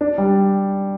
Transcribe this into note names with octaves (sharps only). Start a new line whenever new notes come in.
D4
G3